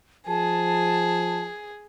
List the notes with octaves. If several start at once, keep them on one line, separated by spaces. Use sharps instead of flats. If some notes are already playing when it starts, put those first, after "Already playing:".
F3 G#4 A5